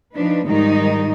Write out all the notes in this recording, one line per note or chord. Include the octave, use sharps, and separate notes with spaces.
F3 D4 D#4 B4
G#2 D#3 F3 G3 G#3 D#4